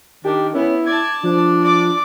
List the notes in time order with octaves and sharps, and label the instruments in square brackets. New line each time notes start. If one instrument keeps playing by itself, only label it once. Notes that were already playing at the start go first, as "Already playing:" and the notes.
[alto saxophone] D#3 [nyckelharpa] D4 [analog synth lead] G4
[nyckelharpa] B3 [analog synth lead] C#4 [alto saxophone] E4
[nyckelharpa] D5 A5 [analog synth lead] G#6
[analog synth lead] F3 [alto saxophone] D4
[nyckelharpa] D5 D6